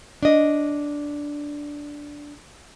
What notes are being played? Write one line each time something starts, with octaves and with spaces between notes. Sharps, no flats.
D4 D#5